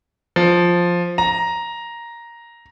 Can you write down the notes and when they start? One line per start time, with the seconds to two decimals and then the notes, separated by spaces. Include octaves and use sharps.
0.36 F3
1.18 A#5